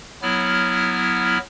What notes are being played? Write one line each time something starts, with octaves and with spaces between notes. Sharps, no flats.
F#3 B3 E4 F6